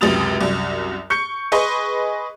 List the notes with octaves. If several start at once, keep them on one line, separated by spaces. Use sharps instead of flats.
C#2 F#2 C3 D#6 A6 F7
C2 F#2
C#6 G6 C#7
G#4 B4 D#5 C6 C#6